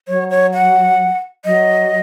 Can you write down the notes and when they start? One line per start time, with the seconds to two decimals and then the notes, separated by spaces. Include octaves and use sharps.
0.08 F#3 C#5
0.31 C#5
0.53 F#5
1.45 F#3 D#5